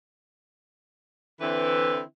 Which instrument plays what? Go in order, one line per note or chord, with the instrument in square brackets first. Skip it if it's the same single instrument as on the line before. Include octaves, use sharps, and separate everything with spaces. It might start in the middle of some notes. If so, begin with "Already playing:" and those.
[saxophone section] D3 E3 C4 E4 B4